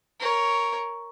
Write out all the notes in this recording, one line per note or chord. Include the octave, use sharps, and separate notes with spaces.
A#4 C#5